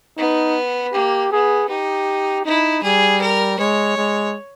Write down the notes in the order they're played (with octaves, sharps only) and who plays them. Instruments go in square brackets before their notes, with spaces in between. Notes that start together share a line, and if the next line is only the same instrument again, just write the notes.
[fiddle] B3 [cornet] D#4
[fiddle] A#3 [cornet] G4
[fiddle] B3 [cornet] G#4
[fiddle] D#4 [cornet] G4
[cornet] D#4 [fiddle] E4
[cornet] G3 [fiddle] G#4
[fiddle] A#4
[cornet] G#3 [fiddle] C#5
[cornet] G#3